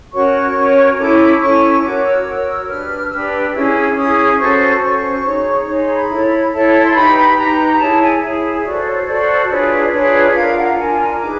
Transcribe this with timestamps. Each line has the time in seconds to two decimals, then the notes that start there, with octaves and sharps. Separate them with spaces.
0.13 C#4 F#4 A#4 C#5 C#6
0.56 C#4 F#4 A#4 C#5
0.98 C#4 E4 A4 D6
1.41 C#4 E4 A4 C#6
1.83 F#4 A#4 C#5 D6
2.04 E6
2.26 F#4 A#4 C#5
2.68 D4 G4 B4 F6
3.11 D4 G4 B4 E6
3.53 C#4 E4 G#4 E6
3.96 C#4 E4 G#4 D#6
4.38 C#4 F#4 A4 C5 C#6
4.81 C#4 F#4 A4 C5 C#6
5.24 D#4 G#4 C#5
5.66 D#4 G#4 C#5
5.80 C6
5.95 B5
6.09 E4 A4 C#5
6.52 E4 A4 C#5 A5
6.84 C6
6.94 D#4 G4 B4 B5
7.16 B5
7.37 D#4 G4 B4 A#5
7.79 E4 G#4 C#5 A5
8.01 G#5
8.22 E4 G#4 C#5 E5
8.64 F#4 A4 C5 D5
8.86 C#5
9.07 F#4 A4 C5 D5
9.49 D4 F4 G#4 B4 C#5
9.92 D4 F4 G#4 B4 C#5
10.35 D4 F4 A#4 F5
10.57 F#5
10.78 D4 F4 A#4 G#5
11.20 D#4 G#4 B4 D6